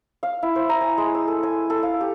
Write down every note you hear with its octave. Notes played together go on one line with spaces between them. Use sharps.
F5
E4
C5
A#5
G#5
G#3
E6
A4
G#5
A4
F5
G4